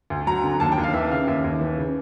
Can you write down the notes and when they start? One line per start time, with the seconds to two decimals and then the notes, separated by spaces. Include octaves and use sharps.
0.10 D2
0.27 F#3 A#5
0.44 D3
0.60 D#2 A5
0.72 G5
0.78 D#2
0.83 F5
0.93 E3 E5
1.11 C#3 F5
1.27 D#2 E5
1.44 D#2
1.61 E3
1.78 C#3